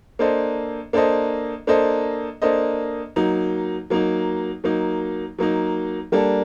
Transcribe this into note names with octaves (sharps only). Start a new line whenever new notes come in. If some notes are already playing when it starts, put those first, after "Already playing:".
A#3 D4 A4 C5 D#5
A#3 D4 A4 C5 D#5
A#3 D4 A4 C5 D#5
A#3 D4 A4 C5 D#5
F#3 A#3 D#4
F#3 A#3 D#4
F#3 A#3 D#4
F#3 A#3 D#4
G3 A#3 D4 A4